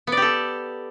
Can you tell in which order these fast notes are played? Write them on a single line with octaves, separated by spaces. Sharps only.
B3 D5 G4 A4